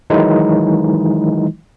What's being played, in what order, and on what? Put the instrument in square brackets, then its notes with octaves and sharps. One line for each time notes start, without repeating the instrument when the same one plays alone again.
[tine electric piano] D#3 E3 F#3 G#3 D#4 E4